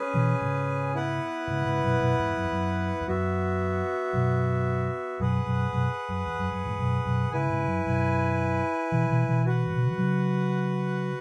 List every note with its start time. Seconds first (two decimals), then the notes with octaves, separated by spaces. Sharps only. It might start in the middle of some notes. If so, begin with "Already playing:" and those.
Already playing: C#4 G#4 B4 G#5
0.14 B2 E3
0.41 G#2 C#3
0.94 B3 E4 B4 F#5
1.48 G#2 C#3
1.64 G#2 C#3
1.83 F#2 B2
2.00 F#2 B2
2.19 E2 G#2
2.36 F#2
2.44 E2
2.52 F#2
3.00 E2
3.07 F#2 B3 F#4 E5
4.13 F#2 B2
5.20 F#2 B2 G#4 B4 F#5
5.46 F#2 B2
5.73 F#2 B2
6.09 F#2
6.26 E2
6.39 F#2
6.52 F#2
6.65 E2 G#2
6.78 F#2 B2
7.05 F#2 B2
7.32 G#2 C#3 E4 B4 G#5
7.49 G#2 C#3
7.67 F#2
7.86 F#2 B2
8.92 B2 E3
9.10 B2 E3
9.27 B2 E3
9.45 F#4 B4 F#5
9.67 G#2
9.74 B2
9.82 C#3
9.90 E3
9.98 C#3 F#3